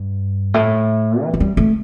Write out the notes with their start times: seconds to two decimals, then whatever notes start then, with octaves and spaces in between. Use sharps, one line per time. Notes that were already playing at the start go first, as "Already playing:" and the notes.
Already playing: G2
0.54 A2
1.23 E3
1.34 E3
1.40 G3
1.57 A3